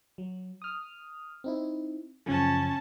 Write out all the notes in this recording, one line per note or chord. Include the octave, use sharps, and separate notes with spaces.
F#3
D#6 F6
C4 D#4 E4
F#2 C#3 F3 C#4 A5